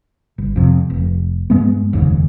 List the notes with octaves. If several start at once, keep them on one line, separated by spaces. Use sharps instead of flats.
G1
F2 C3
F1
G2 G#3 B3
F1 D#2 G#2 C#3